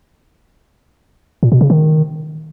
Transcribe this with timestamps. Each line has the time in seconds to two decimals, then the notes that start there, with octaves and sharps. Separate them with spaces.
1.43 A#2
1.52 B2
1.61 C#3
1.70 D#3